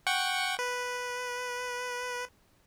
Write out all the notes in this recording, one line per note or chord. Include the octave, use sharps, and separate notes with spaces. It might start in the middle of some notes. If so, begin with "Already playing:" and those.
F#5 G5 C#6
B4